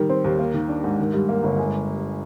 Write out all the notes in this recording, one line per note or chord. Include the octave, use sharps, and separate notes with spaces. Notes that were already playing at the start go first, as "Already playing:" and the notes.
Already playing: D#3 G3
C4
D#2
A#3
D#3
D4
G#2
D#3
G2
A#3
G1
G#3